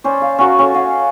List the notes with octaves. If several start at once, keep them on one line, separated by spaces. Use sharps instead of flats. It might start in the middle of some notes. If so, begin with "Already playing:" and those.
C#4 C5 D5
F5
C#4 F#4 A#4
C#4 A4
D#5 F5 F#5